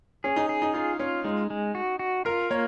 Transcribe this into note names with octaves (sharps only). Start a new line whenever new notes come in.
C#4 G#4
D#4
G#4
D#4
D#4 F4
C#4 F4
G#3 D#4
G#3
F#4
F#4
F4 A#4
A#3 C#5